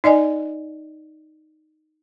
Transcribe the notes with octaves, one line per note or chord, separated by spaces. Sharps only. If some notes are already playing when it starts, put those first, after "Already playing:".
D#4 D5 D#5 G#5